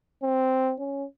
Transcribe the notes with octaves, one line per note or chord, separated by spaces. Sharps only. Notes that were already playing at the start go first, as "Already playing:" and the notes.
C4
C#4